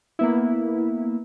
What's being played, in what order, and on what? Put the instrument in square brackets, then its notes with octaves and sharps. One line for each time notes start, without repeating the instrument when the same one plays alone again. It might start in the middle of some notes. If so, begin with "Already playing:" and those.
[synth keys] A#3 B3 E4